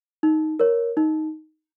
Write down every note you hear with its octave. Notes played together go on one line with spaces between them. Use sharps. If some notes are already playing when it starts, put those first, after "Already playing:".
D#4
A#4 C#5
D#4